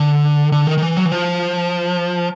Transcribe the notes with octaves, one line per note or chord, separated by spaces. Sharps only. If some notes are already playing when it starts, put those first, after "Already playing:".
Already playing: D3
D3
D#3
D#3
E3
F#3
E3
F3